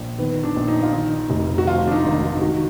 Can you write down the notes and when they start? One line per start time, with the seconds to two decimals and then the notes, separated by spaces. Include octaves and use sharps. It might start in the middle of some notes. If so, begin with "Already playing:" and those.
Already playing: A#1
0.19 D#3 B3
0.43 D4
0.56 A#1
0.68 D#4
0.83 F4
0.93 D#3 D#4
1.30 F1
1.58 F#4
1.67 F3 F4
1.87 D4
1.92 D#4
2.04 G#1
2.17 D#4
2.41 D#3 F#4